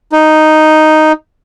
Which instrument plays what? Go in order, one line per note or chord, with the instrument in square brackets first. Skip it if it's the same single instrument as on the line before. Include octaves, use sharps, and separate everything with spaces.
[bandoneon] D#4